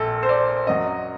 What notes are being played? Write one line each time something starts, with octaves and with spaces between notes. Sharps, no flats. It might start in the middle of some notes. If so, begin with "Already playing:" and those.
Already playing: A#1 A#2 A4
C5
D5
F#2 F#3 D#5